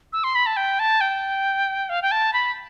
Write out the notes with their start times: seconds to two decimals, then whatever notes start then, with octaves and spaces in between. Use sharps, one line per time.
0.13 E6
0.24 C6
0.35 B5
0.46 A5
0.57 G5
0.79 A5
1.01 G5
1.89 F5
2.02 G5
2.11 A5
2.33 B5